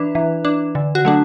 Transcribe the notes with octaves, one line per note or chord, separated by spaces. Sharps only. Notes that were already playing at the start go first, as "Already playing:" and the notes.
Already playing: E3 D4 B4
E3
D4
D3
F#4
F#3 A3 D4